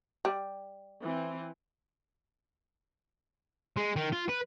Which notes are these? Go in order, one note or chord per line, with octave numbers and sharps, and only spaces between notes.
G3
E3 C4
G#3
D#3
F4
B4